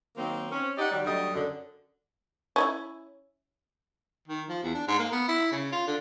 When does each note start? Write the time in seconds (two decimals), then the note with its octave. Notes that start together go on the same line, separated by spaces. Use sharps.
0.17 D#3 F#3 A#3 C4
0.52 C4 C#4
0.78 D#4 G4 D5 D#5 F#5
0.91 D#3 F#3 G3
1.05 D2 D3 F#3 G3 D#5
1.34 F#2 D3
2.56 C#4 D#4 E4
4.28 D#3
4.49 F3
4.63 E2
4.75 D4
4.88 G#2
4.99 A#3
5.12 B3
5.29 E4
5.52 C#3
5.72 F4
5.87 D3